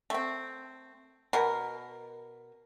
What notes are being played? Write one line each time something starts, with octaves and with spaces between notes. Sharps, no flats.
A3 C4
B2 A#4